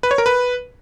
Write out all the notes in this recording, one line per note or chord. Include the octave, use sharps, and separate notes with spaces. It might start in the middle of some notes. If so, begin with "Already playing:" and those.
B4
C#5
A#4
B4